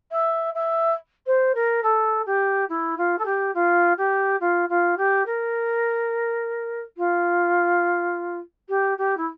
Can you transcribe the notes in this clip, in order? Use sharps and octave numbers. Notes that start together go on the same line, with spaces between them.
E5
E5
C5
A#4
A4
G4
E4
F4
A4
G4
F4
G4
F4
F4
G4
A#4
F4
G4
G4
E4